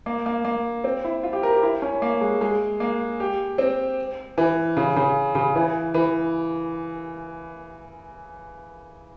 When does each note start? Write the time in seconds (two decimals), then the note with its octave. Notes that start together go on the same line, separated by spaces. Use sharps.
0.06 A#3
0.26 A#3
0.45 A#3
0.84 C4
1.05 E4
1.23 F4
1.33 G4
1.43 A#4
1.53 G4
1.63 E4
1.82 C#4
2.02 A#3
2.21 G#3
2.41 G#3
2.80 A#3
3.20 G4
3.58 C4
4.38 E3
4.77 C#3
4.96 C#3
5.35 C#3
5.55 E3
5.94 E3